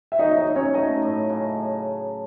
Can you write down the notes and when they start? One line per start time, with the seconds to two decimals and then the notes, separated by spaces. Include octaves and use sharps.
0.12 E5
0.19 F#3 D#4 D#5
0.37 D#4 D#5
0.47 F#3
0.55 C#4 C#5
0.74 A3 D#4 D#5
1.02 A2
1.29 C#3